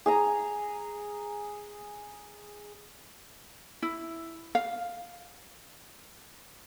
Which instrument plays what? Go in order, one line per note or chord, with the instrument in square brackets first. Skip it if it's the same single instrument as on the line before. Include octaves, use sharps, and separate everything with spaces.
[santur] G#4 G#5 A#5
[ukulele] E4
F5